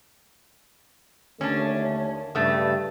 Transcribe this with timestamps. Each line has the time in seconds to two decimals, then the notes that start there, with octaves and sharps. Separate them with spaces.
1.41 D#2 D3 A3 C#4 D4
2.35 G2 C#3 A3